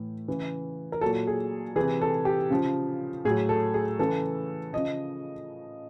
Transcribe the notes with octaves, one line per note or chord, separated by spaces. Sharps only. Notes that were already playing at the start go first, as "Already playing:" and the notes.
Already playing: A2 E3
C#3 E3
A#4
A#2 F#3 A4
G#4
C3 E3 G#4
A4
G4
C#3 F3
A2 F#3 G#4
A4
G#4
C#3 E3 A4
C#3 F3 D#5